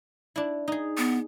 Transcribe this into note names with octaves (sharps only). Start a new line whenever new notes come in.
D4 E4
D#4 G#4
B3